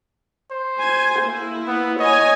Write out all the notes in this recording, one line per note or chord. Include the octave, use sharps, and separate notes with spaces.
C5
G#5
A#3 E4
B3
C#5 D#5 G#5